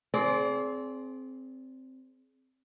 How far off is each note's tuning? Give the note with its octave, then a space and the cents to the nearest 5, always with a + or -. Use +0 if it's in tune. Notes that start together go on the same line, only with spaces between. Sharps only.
C4 +0 G#4 +25 D5 -30